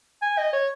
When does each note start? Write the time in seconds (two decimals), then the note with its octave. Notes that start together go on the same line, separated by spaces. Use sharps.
0.22 G#5
0.38 D#5
0.53 C#5